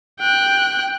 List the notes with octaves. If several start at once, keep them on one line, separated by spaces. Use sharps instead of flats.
G5 F#6